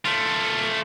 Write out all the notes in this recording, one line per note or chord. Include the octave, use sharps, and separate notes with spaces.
A3 F4